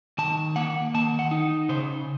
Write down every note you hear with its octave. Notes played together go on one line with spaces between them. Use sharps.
D#3 A5
A#3 F#5
D#3 A5
F#5
D#4
C#3 C5